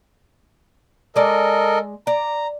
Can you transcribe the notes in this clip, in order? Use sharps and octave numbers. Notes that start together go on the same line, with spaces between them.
G#3 A4 A#4 D5 D#5
D5 A#5